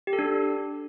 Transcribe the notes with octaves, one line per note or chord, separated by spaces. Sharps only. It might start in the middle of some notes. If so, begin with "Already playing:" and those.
G4
A4
D4